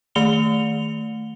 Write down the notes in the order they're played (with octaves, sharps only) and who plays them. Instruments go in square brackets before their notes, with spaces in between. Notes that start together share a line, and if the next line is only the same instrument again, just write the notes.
[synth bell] D#3 A3 C#7 F7 G7